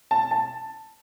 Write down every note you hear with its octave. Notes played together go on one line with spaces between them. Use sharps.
A5
A5